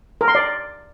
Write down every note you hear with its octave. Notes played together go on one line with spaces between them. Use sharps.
A#4
C6
D5